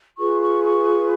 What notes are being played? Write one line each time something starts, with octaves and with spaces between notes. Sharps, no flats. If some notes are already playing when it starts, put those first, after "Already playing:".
F4 G#4 B4 C#6
C#6
C#6